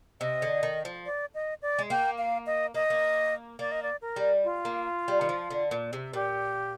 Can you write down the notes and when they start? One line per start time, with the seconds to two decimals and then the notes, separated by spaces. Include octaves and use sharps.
0.21 C3 D#5
0.42 D3
0.63 D#3
0.85 F3
1.06 D5
1.34 D#5
1.62 D5
1.79 G#3
1.90 A#3 G5
2.18 F5
2.46 D#5
2.74 A#3 D#5
2.90 A#3
3.59 A#3 D5
3.72 D#5
3.83 D5
4.02 A#4
4.16 G3
4.44 F4
4.65 A#3
5.08 G3
5.21 D#3
5.29 F3
5.50 D3
5.71 A#2
5.93 C3
6.13 A#2 G4